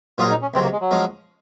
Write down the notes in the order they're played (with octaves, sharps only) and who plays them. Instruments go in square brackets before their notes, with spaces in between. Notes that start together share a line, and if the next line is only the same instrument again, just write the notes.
[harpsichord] A#1 A#2 F#3 C#4 G#4 [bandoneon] F4
[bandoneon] D#4
C#4
[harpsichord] C#2 C3 F#3 [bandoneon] C4
[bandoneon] A#3
G#3
F#3
[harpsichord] F3 G#3 C#4